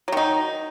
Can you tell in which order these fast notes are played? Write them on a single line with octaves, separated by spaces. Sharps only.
F#3 D#3 D#4